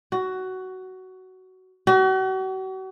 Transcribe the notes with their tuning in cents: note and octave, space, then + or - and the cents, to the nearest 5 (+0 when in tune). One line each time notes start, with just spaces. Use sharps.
F#4 +15
F#4 +40